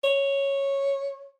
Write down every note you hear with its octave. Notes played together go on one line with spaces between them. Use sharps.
C#5